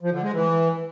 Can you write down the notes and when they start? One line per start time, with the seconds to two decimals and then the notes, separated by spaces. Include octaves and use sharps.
0.01 F3
0.12 D3
0.22 G#3
0.33 E3